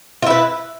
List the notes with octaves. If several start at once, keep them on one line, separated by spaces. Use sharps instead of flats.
E4 F4 B4